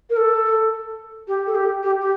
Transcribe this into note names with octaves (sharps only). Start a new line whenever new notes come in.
A#4
A4
G4
A4
G4
G4
G4